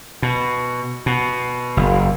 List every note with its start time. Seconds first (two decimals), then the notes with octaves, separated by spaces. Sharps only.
0.22 B2
1.06 B2
1.77 F#1